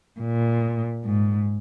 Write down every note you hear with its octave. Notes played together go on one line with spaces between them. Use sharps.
A#2
G#2